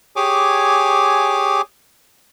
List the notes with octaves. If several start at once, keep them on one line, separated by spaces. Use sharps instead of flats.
G4 G#4 C#5 G#5 D6